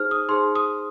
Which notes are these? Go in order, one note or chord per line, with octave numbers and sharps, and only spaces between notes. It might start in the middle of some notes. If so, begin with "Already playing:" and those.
Already playing: D#4 G#4 C5 F6
D#6
D#4 G#4 C5 C6
D#6